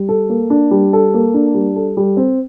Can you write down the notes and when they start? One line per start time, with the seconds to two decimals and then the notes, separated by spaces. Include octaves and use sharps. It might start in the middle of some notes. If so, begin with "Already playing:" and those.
Already playing: G3
0.09 A4
0.29 A#3
0.50 D4
0.71 G3
0.93 A4
1.14 A#3
1.34 D4
1.54 G3
1.76 A4
1.97 G3
2.17 C4